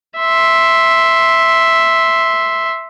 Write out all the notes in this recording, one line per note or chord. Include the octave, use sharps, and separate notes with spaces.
E5 C6